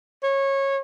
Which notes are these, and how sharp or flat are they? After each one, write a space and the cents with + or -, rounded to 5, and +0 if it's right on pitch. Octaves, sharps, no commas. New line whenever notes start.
C#5 -20